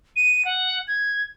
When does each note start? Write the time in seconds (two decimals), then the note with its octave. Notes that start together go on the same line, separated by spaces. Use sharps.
0.16 D#7
0.45 F#5
0.88 G#6